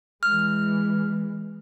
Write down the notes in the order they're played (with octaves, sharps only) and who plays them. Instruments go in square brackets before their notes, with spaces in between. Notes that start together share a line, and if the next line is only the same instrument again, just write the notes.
[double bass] E3 G#3 [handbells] F6